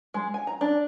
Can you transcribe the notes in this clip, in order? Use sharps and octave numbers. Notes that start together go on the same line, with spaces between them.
G#3
G#5
A#5
D4